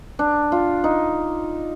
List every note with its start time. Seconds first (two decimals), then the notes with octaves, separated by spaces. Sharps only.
0.19 D4
0.52 F4
0.84 D#4